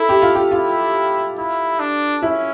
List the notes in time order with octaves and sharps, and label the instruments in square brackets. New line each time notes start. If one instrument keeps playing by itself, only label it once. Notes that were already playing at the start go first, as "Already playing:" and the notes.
Already playing: [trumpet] E4 [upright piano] A4
[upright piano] G4
F4
G4
[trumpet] E4 [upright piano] F4
[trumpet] E4
D4
[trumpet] C#4 [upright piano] E4